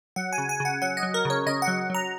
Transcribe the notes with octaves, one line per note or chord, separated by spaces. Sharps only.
F#3 F#5
G#5
C#3
G#5
C#3 F#5
F#3 F#5
D#5
F#3
A#4
C#3 C#5
C#3 D#5
F#5
F#3
F#3 A#5